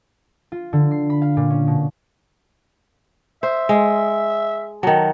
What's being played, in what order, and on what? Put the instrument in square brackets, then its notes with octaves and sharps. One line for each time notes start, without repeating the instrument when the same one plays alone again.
[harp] F4
D3
C7
B5
F5
A#2
C#4
B2
[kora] C5 [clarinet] E5
[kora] G#3
[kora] D#3 F#3 [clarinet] A5